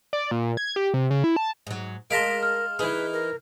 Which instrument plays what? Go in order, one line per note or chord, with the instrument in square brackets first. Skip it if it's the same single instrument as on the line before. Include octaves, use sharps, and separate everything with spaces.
[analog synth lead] D5
A#2
G#6
G4
C3
C#3
E4
A5
[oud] G#2 F#3
[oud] G#3 [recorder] A#4 [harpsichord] F5 A5 C6 [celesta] A#6 B6 D7
[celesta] F6
[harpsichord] E3 D#4 [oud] G#4 [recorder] B4
[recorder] A#4